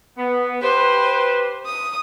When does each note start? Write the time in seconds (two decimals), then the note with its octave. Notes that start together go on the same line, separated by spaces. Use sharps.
0.18 B3
0.62 G4 B4 C5
1.66 D#6